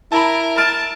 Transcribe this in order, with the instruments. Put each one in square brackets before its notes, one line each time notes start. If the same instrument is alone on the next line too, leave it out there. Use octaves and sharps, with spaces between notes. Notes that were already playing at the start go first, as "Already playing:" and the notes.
[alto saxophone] E4 [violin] A#4 [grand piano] A5 B5
[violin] A5 [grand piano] F6 A6 D7